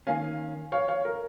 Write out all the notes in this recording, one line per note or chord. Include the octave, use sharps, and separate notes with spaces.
D#3 A#3 C#4 F5 G#5
C#5 F5
C#5 F5
A#4